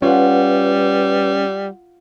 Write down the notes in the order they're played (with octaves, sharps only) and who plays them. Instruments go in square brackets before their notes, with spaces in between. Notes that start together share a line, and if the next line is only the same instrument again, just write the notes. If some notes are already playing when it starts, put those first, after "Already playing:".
[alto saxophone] G3 [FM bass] C#4 [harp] F4 F#5 [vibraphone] B4